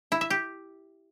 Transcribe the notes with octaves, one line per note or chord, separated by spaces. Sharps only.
E4
E5
G4